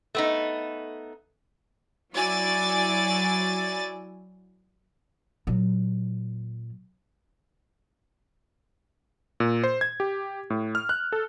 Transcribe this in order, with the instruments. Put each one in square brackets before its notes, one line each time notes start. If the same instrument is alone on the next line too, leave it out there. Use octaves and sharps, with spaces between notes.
[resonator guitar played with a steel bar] A3 B3 D#4
[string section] F#3 E4 F#4 D5 G#5 A6
[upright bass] A#2 F#3
[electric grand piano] A#2
C5
G#6
G4
A2
F6
F#6
A4